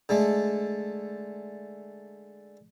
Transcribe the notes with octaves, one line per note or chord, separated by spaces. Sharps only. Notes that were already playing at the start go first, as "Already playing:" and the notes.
D3 G#3 A3